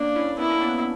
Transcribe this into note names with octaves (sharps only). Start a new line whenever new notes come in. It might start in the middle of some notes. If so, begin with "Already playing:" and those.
Already playing: A#3 C#4 D4
C#4 E4
B3 D4 E4
A#3 C#4
B3 D4